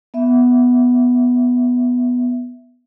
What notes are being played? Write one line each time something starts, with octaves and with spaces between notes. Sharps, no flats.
B3 E5